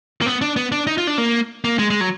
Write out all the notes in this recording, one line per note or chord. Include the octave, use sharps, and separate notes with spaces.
A#3
B3
D4
B3
D4
D#4
F4
D4
A#3
A#3
G#3
G#3
F#3